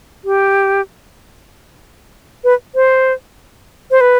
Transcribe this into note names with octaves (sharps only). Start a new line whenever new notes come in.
G4
B4
C5
C5
B4